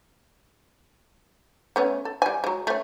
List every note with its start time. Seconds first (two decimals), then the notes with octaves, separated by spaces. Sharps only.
1.76 A3 B3 C#4
2.05 A4
2.22 G3 G#5
2.44 F#3 G#3
2.67 A3 C#4